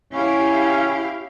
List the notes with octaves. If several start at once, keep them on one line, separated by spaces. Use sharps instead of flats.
C#4 E4 G4 F5